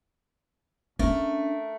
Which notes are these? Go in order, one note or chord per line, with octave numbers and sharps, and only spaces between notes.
A3 C#4 D4 A#4